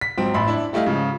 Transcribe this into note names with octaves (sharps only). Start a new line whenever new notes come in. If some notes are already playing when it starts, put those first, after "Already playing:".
B6
G#2 F3 F#3 C4
A1 E5 B5 C6
D4 E4
G3 A3 E4 D#5 F5
G#2 C#3 F3